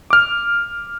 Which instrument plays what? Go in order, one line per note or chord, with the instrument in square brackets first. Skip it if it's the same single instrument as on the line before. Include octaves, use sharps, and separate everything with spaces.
[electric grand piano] D6 F6